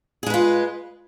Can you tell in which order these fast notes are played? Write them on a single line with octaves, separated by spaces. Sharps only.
G#4 G#3 B4 F4